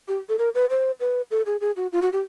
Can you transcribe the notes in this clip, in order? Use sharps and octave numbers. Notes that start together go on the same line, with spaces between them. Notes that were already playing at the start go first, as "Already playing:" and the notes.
G4
A4
A#4
B4
C5
B4
A4
G#4
G#4
F#4
F4
F#4
G4